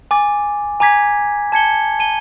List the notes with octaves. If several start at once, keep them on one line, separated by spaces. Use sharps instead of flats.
G#5 D6 A6
G#5 A#5 D6 G#6 B6
A5 G#6 C#7 G7
A5 D#7 G7